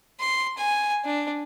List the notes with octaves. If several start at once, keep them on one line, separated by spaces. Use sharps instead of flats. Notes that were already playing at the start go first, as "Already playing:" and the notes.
C6
G#5
D4